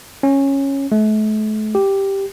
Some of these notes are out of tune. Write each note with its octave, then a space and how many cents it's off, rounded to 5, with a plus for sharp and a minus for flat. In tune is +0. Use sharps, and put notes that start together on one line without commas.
C#4 -10
A3 -40
G4 +0